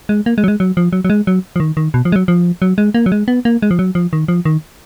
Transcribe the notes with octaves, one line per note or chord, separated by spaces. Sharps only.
G#3
A#3
G#3
F#3
G#3
F#3
F3
F#3
F#3
G#3
F#3
F3
D#3
D#3
B2
F3
G#3
F#3
F3
F#3
G#3
A#3
F#3
G#3
B3
A#3
G#3
F3
F#3
F3
D#3
F3
D#3